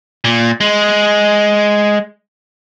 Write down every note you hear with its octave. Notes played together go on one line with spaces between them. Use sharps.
A#2
G#3